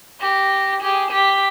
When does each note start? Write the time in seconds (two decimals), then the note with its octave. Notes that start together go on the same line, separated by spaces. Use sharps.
0.20 G4 A#6
0.81 G4 G#4
1.11 G4 B6